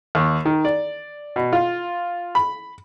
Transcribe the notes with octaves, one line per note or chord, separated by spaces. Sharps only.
D#2
D#3
D5
B2
F4
B5